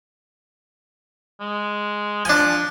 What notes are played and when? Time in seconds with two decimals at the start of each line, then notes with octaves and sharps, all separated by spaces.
1.41 G#3
2.25 F3 D4 G#5